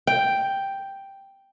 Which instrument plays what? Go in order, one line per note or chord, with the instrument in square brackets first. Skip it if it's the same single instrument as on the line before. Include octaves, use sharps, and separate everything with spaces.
[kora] G5